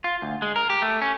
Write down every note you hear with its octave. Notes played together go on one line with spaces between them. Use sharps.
F4
D2
G#3
A#4
G4
A3
C#4